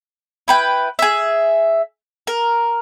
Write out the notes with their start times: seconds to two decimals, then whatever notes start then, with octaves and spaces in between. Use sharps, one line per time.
0.48 E4 B4 G5
0.99 G#4 E5
2.27 A#4